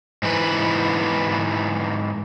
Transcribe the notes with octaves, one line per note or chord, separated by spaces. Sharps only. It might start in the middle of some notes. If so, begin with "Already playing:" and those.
G#2 E3 B4